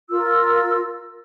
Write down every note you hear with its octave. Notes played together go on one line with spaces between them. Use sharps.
F4 A#4 E6